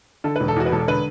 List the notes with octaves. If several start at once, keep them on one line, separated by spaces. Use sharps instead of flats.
D3 A4
E1 B4
A4
E2 F#4
B4
E1 A4
D3 B4